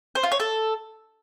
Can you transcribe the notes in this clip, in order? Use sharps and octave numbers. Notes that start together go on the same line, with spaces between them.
C5
F4
C#5
A4